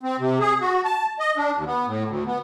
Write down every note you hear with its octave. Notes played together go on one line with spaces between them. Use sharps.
C4
C3
G#4
F#4
A5
D#5
D4
D#2
B3
A2
D2
B3